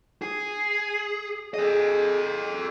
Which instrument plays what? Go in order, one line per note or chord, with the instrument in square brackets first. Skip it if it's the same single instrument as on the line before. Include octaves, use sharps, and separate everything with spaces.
[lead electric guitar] G#4
[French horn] G#4 [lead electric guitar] A4 D#5